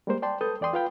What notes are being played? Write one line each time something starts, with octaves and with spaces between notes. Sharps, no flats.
G3 G#3 A#3 A#4 C5
D5 G5 A5 C6
A4 B4 A5 D#6 G6
E2 D5 G5 C6 D#6
F4 B4 F5 G5 B5